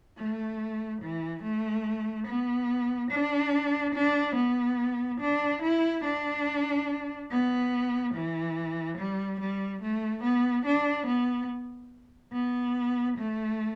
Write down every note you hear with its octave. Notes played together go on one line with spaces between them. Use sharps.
A3
E3
A3
B3
D4
D4
B3
D4
E4
D4
B3
E3
G3
G3
A3
B3
D4
B3
B3
A3